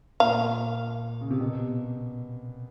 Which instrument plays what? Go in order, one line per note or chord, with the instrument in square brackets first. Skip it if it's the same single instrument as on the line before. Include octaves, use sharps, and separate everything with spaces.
[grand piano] A#2 [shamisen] F5
[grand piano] C#3
C3
B2